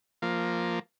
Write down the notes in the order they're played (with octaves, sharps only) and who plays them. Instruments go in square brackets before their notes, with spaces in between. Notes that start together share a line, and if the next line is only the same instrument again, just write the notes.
[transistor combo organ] F3 A#3